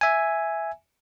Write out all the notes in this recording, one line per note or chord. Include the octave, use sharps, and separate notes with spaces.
E5 G#5